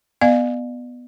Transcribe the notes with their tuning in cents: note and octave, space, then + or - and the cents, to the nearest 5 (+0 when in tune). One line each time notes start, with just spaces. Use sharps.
B3 +0 D5 +40 F5 +0